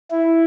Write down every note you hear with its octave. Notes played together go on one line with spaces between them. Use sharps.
E4